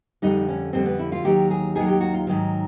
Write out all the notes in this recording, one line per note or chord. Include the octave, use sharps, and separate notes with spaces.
F2 D3 G3 D#4
C#4
F2 D3 G3 C4
B3
E4
F4
D#2 D#3 F#3 G4
G#4
D#2 D#3 F#3 G#4
G4
F#4
F4
G#2 D#3 F#3